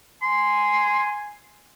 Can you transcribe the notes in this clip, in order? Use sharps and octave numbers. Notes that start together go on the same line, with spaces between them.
G#5 C6